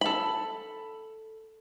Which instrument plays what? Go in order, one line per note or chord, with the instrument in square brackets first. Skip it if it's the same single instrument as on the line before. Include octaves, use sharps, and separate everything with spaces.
[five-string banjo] A4 B5